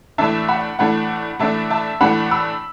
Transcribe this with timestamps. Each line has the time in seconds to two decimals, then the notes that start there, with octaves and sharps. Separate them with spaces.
0.18 A2 E3 A3 D4 E5 A5
0.48 F#5 B5
0.79 A2 E3 A3 D4 F#5 B5
1.39 A2 E3 A3 D4 E5 A5
1.70 E5 A5
2.01 A2 E3 A3 D4 F#5 B5
2.31 B5 E6